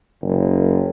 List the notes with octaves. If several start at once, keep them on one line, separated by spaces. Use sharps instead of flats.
F#1